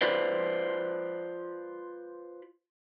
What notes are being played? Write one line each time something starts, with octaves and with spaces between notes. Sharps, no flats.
F4 B4 C5 D5